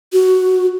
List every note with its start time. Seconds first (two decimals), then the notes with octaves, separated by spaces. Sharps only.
0.13 F#4